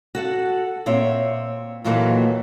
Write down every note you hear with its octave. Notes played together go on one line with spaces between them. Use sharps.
F#4 A4 F#5
A#2 C4 C#5 E5
D#2 A#2 E3 F#3 A#3 A4